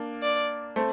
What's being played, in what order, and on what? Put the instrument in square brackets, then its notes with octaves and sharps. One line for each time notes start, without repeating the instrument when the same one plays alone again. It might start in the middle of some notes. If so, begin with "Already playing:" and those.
Already playing: [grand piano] A#3 D4
[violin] D5
[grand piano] A3 C4